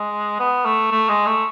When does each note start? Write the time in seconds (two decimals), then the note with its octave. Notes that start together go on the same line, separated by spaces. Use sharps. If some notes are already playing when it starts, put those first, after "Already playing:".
Already playing: G#3
0.40 B3
0.65 A3
0.92 A3
1.09 G#3
1.26 A3